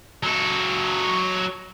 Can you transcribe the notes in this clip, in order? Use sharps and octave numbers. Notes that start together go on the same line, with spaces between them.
F#3 A4